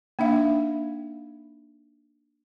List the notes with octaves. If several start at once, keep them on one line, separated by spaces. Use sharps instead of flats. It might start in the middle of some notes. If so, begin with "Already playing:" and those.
A#3 D4 D#4 E5 F5